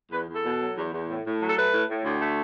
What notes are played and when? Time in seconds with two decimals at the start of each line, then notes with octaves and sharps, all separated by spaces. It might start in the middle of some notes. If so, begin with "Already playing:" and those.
0.11 E2 B4
0.28 E2
0.35 A4
0.43 B2
0.60 F#3
0.76 E2
0.92 E2
1.09 A2
1.25 A2
1.40 F#3
1.48 A4
1.56 A3 B4
1.73 A2
1.88 A2
2.05 D2
2.21 A3